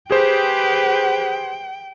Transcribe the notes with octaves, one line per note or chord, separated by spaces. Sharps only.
G4 G#4 B4 C5 G5